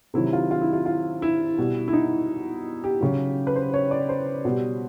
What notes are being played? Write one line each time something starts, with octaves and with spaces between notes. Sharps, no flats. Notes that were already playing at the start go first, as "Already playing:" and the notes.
C3 D#3 F#3 E4
F4
F4
E4
F4
F4
E4
B2 G3
E4
D#4
G4
C#3 F#3
B4
C5
C#5
D5
C5
B2 G3